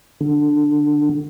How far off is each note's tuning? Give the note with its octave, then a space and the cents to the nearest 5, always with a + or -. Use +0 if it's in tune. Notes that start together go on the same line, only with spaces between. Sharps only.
D3 +10